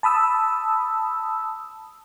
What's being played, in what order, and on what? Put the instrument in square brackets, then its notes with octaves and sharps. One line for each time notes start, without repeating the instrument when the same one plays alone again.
[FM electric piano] A5 B5 D#6 E6